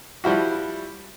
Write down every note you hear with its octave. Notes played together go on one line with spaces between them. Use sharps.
F3 G3 E4 F#4